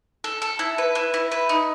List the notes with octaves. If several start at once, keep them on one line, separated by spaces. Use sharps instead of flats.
A4
A4
E4
B4
E4
E4
B4
D#4